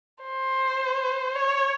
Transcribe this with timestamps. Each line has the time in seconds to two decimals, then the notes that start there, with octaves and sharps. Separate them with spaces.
0.22 C5
1.36 C#5